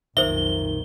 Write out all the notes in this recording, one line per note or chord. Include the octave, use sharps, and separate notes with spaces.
B1 F2 A#2 D#3 C5 E5 G7